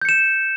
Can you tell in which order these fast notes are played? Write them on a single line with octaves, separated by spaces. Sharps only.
G6 C#7 E7